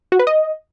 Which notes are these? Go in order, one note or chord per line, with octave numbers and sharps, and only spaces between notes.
F#4
B4
D#5